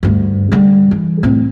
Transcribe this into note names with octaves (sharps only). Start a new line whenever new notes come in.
D2 G2
D3 G3
E3
A2 C4